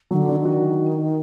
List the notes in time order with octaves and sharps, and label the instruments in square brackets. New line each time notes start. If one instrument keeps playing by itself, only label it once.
[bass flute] D#3 [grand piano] F#3
[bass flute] D3
[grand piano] D4
[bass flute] D#3
[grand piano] F#4